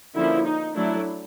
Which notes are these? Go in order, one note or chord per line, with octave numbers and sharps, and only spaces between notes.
D3 F3 A#3 C#4 E4
D#4
F#3 A3 D4 E4